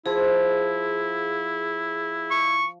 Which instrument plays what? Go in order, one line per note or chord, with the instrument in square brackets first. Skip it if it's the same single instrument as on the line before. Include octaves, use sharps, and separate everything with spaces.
[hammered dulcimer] F3 [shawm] E4 [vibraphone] G#4
[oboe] C#6